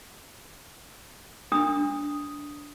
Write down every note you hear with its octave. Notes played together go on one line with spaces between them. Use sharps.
D4 D#6